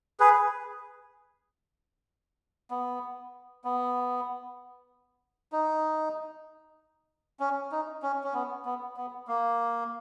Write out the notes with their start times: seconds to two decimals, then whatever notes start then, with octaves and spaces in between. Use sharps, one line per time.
0.20 G#4 B4
2.71 B3
3.64 B3
5.52 D#4
7.40 C#4
7.72 D#4
8.02 C#4
8.24 C#4
8.34 B3
8.65 B3
8.97 B3
9.27 A#3